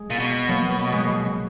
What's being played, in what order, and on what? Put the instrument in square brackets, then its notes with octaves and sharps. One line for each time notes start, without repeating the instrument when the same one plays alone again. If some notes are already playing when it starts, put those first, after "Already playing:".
Already playing: [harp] G#3
[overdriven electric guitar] A#2
B2
[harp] F#3 A#3
G#3 B3